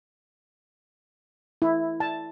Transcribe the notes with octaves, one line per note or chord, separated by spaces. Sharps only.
E4
A5